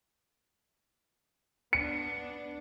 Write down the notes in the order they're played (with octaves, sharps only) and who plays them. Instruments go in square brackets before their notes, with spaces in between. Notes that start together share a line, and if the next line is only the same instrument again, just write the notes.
[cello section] B3 D4 [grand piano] C#7